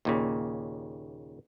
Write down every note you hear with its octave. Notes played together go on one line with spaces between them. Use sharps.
D#2 A#2 C#3